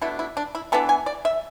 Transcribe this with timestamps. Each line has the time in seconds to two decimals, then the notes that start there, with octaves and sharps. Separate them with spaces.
0.01 B2 A3 D4 E4
0.19 E4
0.37 D4
0.55 E4
0.72 E3 B3 D4 A4
0.89 G#5
1.06 D5
1.25 E5